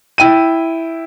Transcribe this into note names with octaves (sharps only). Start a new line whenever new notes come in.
E4 G5 D#7